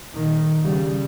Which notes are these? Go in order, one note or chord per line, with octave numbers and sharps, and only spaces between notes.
A#2 D#3
C#3 G3